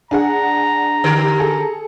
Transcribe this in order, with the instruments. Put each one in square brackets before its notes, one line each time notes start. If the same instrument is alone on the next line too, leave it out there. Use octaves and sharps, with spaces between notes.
[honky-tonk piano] D4 G#4 F#5 [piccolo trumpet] A#5
[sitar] D3 G4 A#4
[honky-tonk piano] G#4 A4